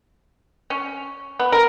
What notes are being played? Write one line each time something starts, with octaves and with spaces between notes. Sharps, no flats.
C#4
B3
A#4